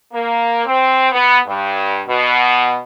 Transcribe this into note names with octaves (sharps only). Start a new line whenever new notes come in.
A#3
C4
B3
G2
B2